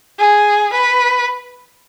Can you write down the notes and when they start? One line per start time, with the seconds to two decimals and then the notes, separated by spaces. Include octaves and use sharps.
0.19 G#4
0.74 B4